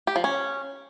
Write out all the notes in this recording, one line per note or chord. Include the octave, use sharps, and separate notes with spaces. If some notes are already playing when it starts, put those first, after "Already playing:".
G4
F3
C#4